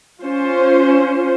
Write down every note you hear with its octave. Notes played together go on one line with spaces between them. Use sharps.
C#4 F4 C5